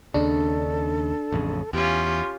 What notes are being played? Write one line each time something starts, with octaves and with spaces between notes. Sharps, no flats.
D#2 C#3 D4 A4
A1 F2 C#3
E2 C#4 F4 G4 C6